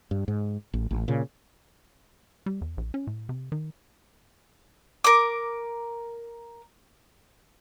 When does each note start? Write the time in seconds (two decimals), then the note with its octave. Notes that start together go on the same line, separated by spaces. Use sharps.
0.11 G2
0.28 G#2
0.73 A1
0.91 A1
1.08 A#2 C#3
2.46 G3
2.61 E2
2.77 A#1
2.94 C#4
3.07 A2
3.29 C3
3.52 D#3
5.04 A#4 D6